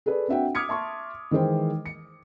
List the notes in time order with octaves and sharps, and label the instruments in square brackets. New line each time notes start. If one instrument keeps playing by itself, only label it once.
[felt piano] G#4 A4 B4 D5
C4 D4 F#4 E5 F#5 G5
D6 D#6 F6 G#6 B6 C#7
E5 A5 C6 C#6
D#3 E3 G#3 C5 G5
C#7